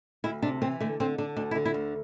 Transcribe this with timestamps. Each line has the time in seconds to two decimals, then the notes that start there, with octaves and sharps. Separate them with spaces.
0.24 D2 E4
0.42 C3 D4
0.62 E3 C4
0.80 D3 A3
1.00 D3 C4
1.18 D3 D4
1.36 D2 D4
1.51 E4
1.55 D3
1.65 E4
1.74 D2